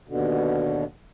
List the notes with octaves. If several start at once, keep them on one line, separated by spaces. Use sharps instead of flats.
D#2 B2 D3